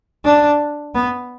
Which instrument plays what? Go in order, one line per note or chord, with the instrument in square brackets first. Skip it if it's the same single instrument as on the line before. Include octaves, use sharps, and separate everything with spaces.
[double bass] D4
B3